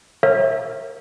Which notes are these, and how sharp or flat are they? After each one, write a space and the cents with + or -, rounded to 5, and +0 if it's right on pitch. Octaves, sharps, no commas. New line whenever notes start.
A#4 +0 C#5 -35 E5 +0